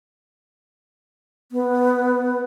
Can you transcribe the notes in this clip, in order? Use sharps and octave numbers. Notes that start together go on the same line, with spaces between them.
B3